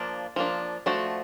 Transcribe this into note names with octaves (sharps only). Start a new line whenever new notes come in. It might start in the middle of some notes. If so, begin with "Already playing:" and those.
Already playing: F3 A#3 D4
F3 A#3 D4
F3 A3 D4 F#4